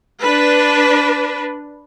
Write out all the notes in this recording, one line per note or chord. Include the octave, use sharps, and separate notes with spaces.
D4 B4